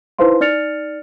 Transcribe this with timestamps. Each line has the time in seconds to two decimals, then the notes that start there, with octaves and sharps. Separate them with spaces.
0.19 D#4 E4 B4 C5 F5 C6
0.41 D#4 D5 F6 A6 C#7 F7